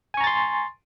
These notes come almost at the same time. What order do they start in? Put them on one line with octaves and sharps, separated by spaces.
G#5 C#6 A#5 A6 C6